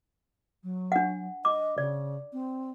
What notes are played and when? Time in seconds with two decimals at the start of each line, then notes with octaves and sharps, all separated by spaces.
0.63 F#3
0.92 D4 F#5
1.45 D#5 D6
1.78 C#3 D5
2.33 C4